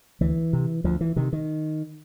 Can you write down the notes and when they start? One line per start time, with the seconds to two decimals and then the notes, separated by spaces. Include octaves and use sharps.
0.21 D2 E3
0.53 C3
0.84 D2 F3
1.01 E3
1.16 C3 D#3
1.33 D#3